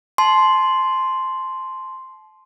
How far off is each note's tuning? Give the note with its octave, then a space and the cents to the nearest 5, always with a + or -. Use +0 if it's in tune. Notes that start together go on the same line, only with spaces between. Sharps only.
A5 -30 C6 +0